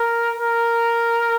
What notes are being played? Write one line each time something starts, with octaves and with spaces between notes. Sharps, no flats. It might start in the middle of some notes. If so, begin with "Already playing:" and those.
Already playing: A#4
A#4